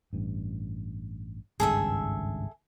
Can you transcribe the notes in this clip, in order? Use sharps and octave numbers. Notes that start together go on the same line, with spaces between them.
A1 G2
G#1 C#2 G2 G#4 A4 E5